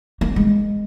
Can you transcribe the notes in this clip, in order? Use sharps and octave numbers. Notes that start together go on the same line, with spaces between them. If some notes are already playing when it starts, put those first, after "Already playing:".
A#3
G#3